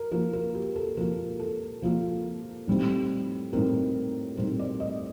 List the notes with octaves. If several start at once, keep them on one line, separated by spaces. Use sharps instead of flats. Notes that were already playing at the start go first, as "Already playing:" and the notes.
Already playing: A#4
F3 A#3 F4 A#4
A#4
G4
A4
F3 A#3 F4 A#4
A4
F3 A#3 F4
A2 G3 C4 D#4
A2 G3 C4 D#4 A#4
A2 G3 C4 D#4 C5
D5
D#5